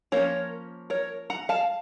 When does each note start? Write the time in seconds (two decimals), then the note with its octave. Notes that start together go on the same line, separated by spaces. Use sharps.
0.12 F3 A#3 C#4 A#4 C#5
0.90 A#4 C#5
1.30 F#5 A#5
1.49 F5 A5